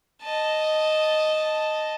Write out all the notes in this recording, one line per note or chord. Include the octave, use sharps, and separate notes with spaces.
D#5 A5